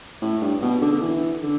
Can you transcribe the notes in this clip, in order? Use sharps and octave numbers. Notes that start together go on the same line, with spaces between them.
A2
G2
B2
D3
D3
E3
D3